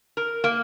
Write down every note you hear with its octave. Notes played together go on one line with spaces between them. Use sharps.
A#4
A#3